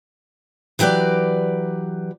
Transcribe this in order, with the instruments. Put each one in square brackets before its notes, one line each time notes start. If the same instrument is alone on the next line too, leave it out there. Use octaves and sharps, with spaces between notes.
[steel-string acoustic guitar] E3 F#3 G4 B4 D5